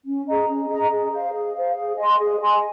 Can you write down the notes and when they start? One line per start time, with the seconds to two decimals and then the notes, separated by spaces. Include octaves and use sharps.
0.05 C#4
0.27 G#4 D#5 A#5
0.48 C#4
0.69 G#4 D#5 A#5
0.90 G#4
1.12 C5 F5
1.33 G#4
1.55 C5 F5
1.76 G#4
1.97 D#5 G#5 C6
2.19 G#4
2.40 D#5 G#5 C6